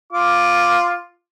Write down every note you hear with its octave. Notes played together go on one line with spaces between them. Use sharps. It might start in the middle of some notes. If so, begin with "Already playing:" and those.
F4 D6